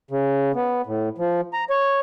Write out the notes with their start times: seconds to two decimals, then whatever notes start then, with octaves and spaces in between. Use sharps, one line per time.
0.11 C#3
0.55 B3
0.86 A2
1.18 F3
1.53 A#5
1.70 C#5